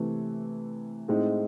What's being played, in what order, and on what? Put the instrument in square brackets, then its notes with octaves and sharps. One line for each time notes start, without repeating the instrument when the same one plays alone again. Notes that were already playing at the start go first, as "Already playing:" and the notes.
Already playing: [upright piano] C3 E3 A3
A2 G#3 C4 D#4